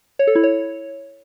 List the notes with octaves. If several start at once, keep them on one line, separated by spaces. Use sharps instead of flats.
C#5
A4
E4
C#5